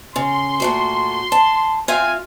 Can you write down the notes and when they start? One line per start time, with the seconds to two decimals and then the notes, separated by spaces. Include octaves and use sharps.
0.16 C#3 C6
0.60 A#2 A3 F#4
1.32 A5
1.88 C4 F4 E5 F5 G#5